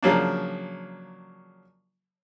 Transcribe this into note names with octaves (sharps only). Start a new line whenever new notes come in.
C#3 F3 F#3 A#3 D4